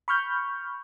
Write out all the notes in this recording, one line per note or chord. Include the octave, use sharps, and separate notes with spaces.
B5 C#6 F6 G6